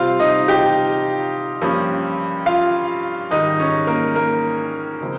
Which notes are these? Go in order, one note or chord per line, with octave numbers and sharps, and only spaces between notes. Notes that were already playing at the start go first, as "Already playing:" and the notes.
Already playing: C3 G3 C4 F4 F5
D#4 D#5
G4 G5
G2 F3 A#3 C#4
F4 F5
G#2 D#3 G3 D#4 D#5
C#4 C#5
A#3 A#4
A#3 A#4
C#3 F3 G#3 C4